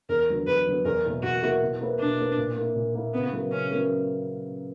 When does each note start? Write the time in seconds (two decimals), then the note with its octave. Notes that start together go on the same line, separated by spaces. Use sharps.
0.09 E2 A#4
0.28 D3 F#3 B3
0.47 E2 B4
0.66 D3 F#3 B3
0.85 E2 A#4
1.04 B2 A#3 E4 A#4
1.23 E2 F#4
1.42 B2 A#3 E4 A#4
1.62 B2
1.80 A#3 E4 B4
1.99 B2 D4
2.19 A#3 E4 B4
2.37 A#2
2.57 A#3 E4
2.76 A#2
2.95 A#3 E4
3.13 C#3 B3
3.32 F#3 B3 E4 A#4
3.52 C#3 C#4
3.71 F#3 B3 E4 A#4